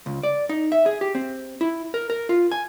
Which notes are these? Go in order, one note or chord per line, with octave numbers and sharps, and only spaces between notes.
C#2
D5
D#4
E5
G#4
G4
C4
E4
A#4
A#4
F4
G#5